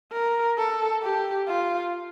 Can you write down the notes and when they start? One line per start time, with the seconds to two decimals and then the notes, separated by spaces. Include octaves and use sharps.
0.12 A#4
0.58 A4
1.03 G4
1.48 F4